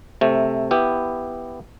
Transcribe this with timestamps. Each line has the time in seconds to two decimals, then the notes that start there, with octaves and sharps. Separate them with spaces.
0.21 C3 A3
0.71 B3 E4 G4